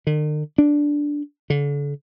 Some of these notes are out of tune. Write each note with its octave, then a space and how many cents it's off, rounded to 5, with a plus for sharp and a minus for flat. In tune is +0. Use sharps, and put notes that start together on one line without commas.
D#3 -45
D4 -5
D3 -40